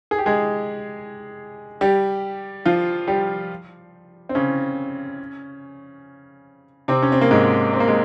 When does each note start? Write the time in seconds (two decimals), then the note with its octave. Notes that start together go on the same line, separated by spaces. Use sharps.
0.11 G#4
0.18 G4
0.26 G#3 G#4
1.81 G3 G4
2.65 F3 F4
3.08 G3 G4
4.29 C4
4.35 C#3 C#4
6.88 C3 C4
7.02 C#4
7.12 C4
7.21 A#3
7.31 G#2 G#3
7.73 C4
7.80 A#3
7.88 G#3